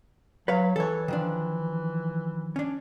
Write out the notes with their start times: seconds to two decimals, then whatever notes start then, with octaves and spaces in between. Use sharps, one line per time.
0.48 F#3 B4 C#5 F5
0.76 E3 A4 C#5
1.08 D#3 F3 D4
2.56 C#4 D4